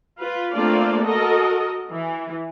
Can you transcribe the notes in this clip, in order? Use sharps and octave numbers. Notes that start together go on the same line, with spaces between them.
F4 B4
A3 A#3 C4 D4 F4 D5
F#4 A4 A#4 D#5
E3